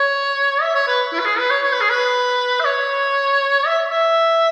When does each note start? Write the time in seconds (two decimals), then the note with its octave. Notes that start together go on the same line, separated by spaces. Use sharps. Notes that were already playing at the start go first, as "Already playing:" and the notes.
Already playing: C#5
0.62 E5
0.75 C#5
0.87 B4
1.13 E4
1.19 B4
1.25 G#4
1.38 B4
1.51 C#5
1.63 C#5
1.73 B4
1.81 G#4
1.89 B4
2.60 E5
2.65 C#5
3.66 E5
3.92 E5